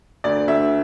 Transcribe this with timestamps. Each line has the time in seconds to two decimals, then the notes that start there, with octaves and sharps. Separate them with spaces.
0.24 D2 D5
0.47 D2 E5